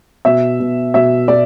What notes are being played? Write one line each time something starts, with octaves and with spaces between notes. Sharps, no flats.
B2 E5
B2
B2 E5
B2 D5